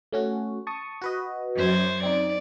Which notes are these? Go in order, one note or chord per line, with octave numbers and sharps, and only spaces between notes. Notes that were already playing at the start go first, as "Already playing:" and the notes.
A3 C#4 F#4
A5 C#6 D#6
F#4 B4 D#5
F#2 C5 G#6
C4 D#4 D5